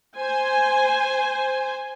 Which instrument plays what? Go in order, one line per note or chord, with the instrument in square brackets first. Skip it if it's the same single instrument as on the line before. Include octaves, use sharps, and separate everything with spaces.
[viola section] C5 G#5